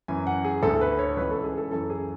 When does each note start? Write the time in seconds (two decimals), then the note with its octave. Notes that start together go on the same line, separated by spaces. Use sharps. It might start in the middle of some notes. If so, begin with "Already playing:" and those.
0.08 F#2 E3 G#5
0.27 F#5
0.45 G#4
0.63 D2 D3 A4
0.81 B4
0.99 C#5
1.17 C#2 C#3 E3 B4
1.31 A4
1.44 G#4
1.57 A4
1.71 F#2 E3 A4
1.90 G#4